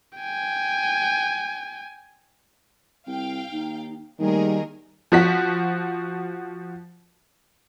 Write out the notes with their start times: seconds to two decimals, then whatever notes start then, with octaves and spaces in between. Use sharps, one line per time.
0.18 G5 G#5
3.07 C2 F5 G5
3.52 D#2 D#4
4.20 D#2 D#3 G3 A3 G#4 A#4
5.12 F3 F#4 B6